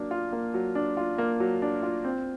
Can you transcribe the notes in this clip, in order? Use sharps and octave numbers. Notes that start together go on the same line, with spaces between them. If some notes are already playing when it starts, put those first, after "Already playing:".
Already playing: F#3 A#3 D4
F4
A#3
F#3
D4
F4
A#3
F#3
D4
F4
C4